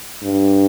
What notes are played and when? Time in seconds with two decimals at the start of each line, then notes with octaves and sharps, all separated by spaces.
0.24 G2